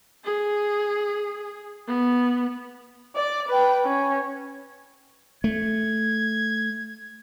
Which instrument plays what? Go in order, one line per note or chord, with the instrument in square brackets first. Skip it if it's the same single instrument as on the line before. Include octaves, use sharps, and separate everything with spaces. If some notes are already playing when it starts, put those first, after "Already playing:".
[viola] G#4
B3
[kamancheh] D5
B4 G5
C#4
[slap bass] A3 [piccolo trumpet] G#6